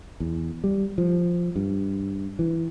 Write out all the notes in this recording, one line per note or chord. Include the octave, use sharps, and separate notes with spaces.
E2
G3
F3
G2
E3